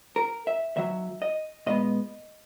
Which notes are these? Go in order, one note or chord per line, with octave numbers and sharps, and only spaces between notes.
A#4
E5
D#2 D#3 F#3 E5
D#5
A#2 G#3 B3 D#5